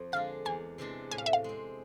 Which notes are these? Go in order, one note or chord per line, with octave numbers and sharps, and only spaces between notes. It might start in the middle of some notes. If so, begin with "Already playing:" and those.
Already playing: F2 F3
D3 G#3 D4 F5
E2 G#5
C3 E3 G#3 D4
A2 G#5
F5
E5
F5
G#3 C4